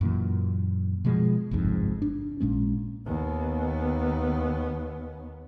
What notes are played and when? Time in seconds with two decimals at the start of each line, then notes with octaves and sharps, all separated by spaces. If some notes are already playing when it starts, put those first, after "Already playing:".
0.01 F#2 A#2 E3
1.05 B2 F3 G#3
1.51 G1 C2 F2 G#2
2.02 D4
2.40 A#1 A#2 G#3 C#4
3.06 D#2 B3